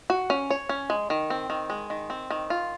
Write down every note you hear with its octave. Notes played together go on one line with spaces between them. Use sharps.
F#4
C#4
C#5
C#4
G#3
D#3
C4
D#3
G#3
D#3
C4
D#3
F4